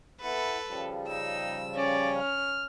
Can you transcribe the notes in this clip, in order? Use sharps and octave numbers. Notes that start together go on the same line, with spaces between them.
B3 E4 A4 B4
C#3 F3 G3
D#4 E6
C#4 D5
F6